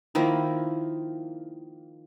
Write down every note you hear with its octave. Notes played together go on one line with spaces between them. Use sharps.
D#3 F3 A#3 E4